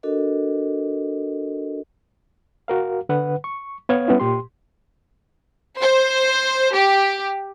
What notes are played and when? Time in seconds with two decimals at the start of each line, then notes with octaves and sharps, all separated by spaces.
0.03 D4 F#4 A4 A#4 D#5
2.68 F#4 A#4 F5
3.09 D3 B4 F#5
3.44 C#6
3.89 B3 C#5 F5 G#6
4.08 G3 B3 C#4 E4
4.20 A#2 G4 C6
5.80 C5
6.74 G4